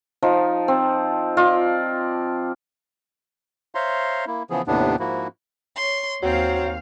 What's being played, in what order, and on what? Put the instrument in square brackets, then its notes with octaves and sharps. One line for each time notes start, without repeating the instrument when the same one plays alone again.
[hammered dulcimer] F3 D#4
C4
F4 D5 D#5
[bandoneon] C5 C#5 E5 F5 A#5 C6
A#3 E4
C#3 E3 F3 B3 G#4
D#2 A2 C3 B3 D4
G#2 F3 A#3 E4 F#4
[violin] C#5 C6
[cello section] D#2 F5 [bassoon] F#3 [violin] C4 C5